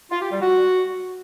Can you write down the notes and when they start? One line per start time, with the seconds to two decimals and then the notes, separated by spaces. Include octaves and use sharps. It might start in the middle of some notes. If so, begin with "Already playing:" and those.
0.11 F4
0.22 G4
0.32 G3
0.42 F#4